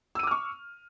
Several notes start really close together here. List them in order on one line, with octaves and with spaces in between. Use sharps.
E6 D#7 D6 F6 C#6